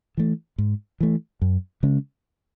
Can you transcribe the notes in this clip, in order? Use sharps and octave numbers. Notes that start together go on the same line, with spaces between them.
E3 A3
G#2
E3 A3
F#2
C#3 G#3 C#4